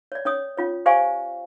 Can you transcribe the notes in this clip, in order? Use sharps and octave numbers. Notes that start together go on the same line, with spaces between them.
C#5 D5
C#4 C#5 D#6
C#4 F4 C#5
G4 C5 D5 F5 G#5 C#6